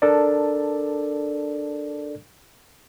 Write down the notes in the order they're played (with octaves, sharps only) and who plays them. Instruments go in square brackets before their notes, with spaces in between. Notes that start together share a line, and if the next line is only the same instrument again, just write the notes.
[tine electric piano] D4 A4 A#4 D5